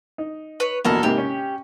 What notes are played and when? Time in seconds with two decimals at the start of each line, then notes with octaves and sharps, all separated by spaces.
0.18 D#4
0.60 B4 C#5
0.85 A#1 E2 B2 A4 A#4
1.03 G#2 C3 A#3 G4
1.18 C#4